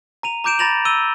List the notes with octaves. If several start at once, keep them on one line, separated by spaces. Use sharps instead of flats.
A#5 D#7 F7
A#5 D6 G6 D7 E7
A#5 B5 A6 A#6 F7 F#7
E6 D#7 G7